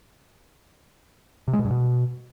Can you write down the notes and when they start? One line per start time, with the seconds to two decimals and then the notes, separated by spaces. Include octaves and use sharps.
1.48 C3
1.53 G#3
1.59 B2
1.65 G2
1.71 B2